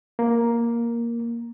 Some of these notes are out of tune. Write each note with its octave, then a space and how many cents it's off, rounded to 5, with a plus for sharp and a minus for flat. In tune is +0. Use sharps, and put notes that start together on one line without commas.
A#3 +5